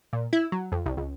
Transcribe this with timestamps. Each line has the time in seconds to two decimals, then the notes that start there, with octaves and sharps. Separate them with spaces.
0.13 A#2
0.33 E4
0.52 F#3
0.72 F2
0.86 C2
0.97 C#2